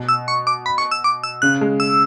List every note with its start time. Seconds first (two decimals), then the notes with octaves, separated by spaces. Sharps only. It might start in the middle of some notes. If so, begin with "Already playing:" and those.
Already playing: B2
0.09 E6
0.28 C#6
0.47 D6
0.66 B5
0.78 C#6
0.91 E6
1.04 D6
1.24 E6
1.42 C#3 F#6
1.61 G#3
1.80 E6